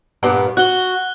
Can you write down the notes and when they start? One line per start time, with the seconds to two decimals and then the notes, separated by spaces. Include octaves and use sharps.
0.23 G2 A#2 B3
0.57 F#4 F#6 G7